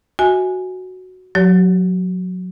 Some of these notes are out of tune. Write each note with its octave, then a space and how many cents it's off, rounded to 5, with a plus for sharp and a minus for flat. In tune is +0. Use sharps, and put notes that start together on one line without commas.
F#4 +0 E5 -40 G#5 +0
F#3 -20 G4 -45 C#5 +45